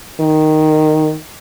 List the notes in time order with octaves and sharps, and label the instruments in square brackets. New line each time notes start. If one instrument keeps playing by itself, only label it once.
[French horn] D#3